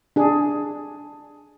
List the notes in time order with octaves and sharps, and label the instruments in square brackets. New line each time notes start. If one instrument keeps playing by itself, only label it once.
[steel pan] D4 G#4